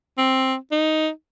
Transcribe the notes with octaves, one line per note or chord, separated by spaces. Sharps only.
C4
D#4